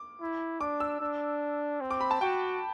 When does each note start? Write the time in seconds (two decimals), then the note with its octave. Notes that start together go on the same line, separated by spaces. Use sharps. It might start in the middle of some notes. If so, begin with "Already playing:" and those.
Already playing: D6
0.21 E4
0.61 D4 D6
0.80 E6
1.01 D4
1.81 C4
1.91 D6
2.01 B5
2.11 A5
2.21 F#4 G5